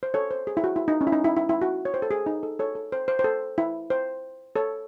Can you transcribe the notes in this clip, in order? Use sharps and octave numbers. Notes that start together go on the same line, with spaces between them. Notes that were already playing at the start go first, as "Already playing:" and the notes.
C5
A4 C#5
C5
G#4
E4
F#4
E4
D#4
C#4
E4
D#4
E4
E4
E4
F#4
C#5
C5
A4
G#4
D#4
A4
A4 C#5
A4
C5
C5
C5
A4
E4
C5
A4 C#5